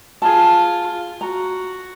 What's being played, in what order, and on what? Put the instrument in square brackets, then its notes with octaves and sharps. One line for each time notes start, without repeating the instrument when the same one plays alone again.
[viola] F4 [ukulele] G#4 A5
[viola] F#4 [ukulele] A#5